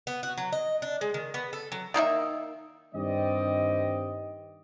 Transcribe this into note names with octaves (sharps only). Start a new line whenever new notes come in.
B3
F#4
F#3
D#5
D4
G#3
D#3
B3
A4
F#3
D#3 A#3 D#4 E5
G2 D#3 G3 C4 D5 D#5